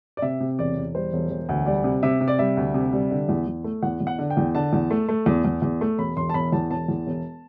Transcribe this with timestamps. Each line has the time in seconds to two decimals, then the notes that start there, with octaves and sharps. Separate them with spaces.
0.17 D5
0.22 C3 E5
0.40 C3
0.59 E1 D5
0.76 E1
0.95 G3 C5
1.13 E1
1.31 E1
1.49 D2
1.66 G3 D5
1.84 C3
2.03 C3 E5
2.20 C3
2.28 D5
2.39 G3 E5
2.57 D2
2.74 C3
2.92 G3
3.11 D3
3.29 E2
3.47 E2
3.64 A3
3.82 E2 F#5
4.00 E2
4.07 F#5
4.19 D3
4.30 G5
4.37 E2
4.55 D3 A5
4.73 E2
4.91 A3
5.08 A3
5.26 E2
5.45 E2
5.62 E2
5.81 A3
5.98 E1 B5
6.17 E1 C6
6.29 A5
6.34 E1 B5
6.52 E2 A5
6.70 E1 A5
6.88 E2
7.07 E1